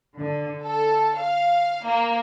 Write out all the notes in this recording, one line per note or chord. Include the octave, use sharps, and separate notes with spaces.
D3
A4
F5
A#3